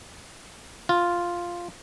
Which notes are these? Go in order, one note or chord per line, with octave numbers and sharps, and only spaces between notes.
F4